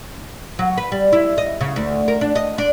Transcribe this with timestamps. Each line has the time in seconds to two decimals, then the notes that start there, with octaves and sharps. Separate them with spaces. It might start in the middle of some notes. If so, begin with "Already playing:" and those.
0.59 F#3
0.78 B4
0.92 G3
1.13 E4
1.38 D#5
1.61 C#3
1.76 D2
2.08 A#4
2.21 D4
2.35 D#5
2.58 D4